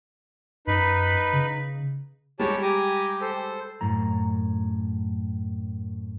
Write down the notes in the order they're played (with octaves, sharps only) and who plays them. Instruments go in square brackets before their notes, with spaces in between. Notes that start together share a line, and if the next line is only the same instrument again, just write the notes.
[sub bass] F#2 [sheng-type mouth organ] D#4 B4 B5
[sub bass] C#3
[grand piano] G3 G#3 [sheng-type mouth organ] G4 C#5 A5
[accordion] G4 [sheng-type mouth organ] G#5 A#5 D6
[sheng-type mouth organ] A4 C5
[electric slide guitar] F#2 A2 A#5